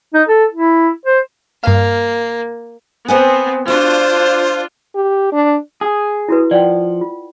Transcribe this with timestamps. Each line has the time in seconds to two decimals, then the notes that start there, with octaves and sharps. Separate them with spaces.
0.14 D#4
0.29 A4
0.53 E4
1.06 C5
1.64 G2 A#3 F5
3.08 B3 C4 C5 F#5 G#5
3.68 D4 F4 F#4 C5
4.95 G4
5.33 D4
5.81 G#4
6.29 E4 F#4 B4
6.51 F3 D5 F#5 G5
7.01 F4